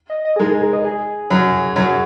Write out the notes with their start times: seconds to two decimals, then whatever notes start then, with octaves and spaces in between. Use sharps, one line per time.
0.10 D#5
0.25 D#5
0.36 G#4
0.39 G#2 G#3 A#4
0.51 G#4
0.62 A#4
0.73 D#5
0.85 G#4
1.30 F#2 F#3
1.76 F#2 F#3